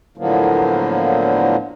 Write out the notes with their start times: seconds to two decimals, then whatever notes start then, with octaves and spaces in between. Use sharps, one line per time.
0.18 A2 D3 F3 F#3 A#3 B3